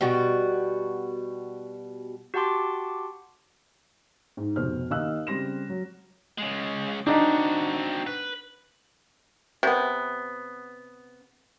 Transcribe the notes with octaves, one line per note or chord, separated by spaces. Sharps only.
B2 G3 F#4
F#4 G4 F#5 A5 C6 D6
G#2
F1 B2 C5 F6
D#2 D#5 F5 E6 F#6
C#3 G3 C4 C6 A#6 E7
F#3
C#3 G#3
C4 D4 D#4 F#4
B4
C3 B3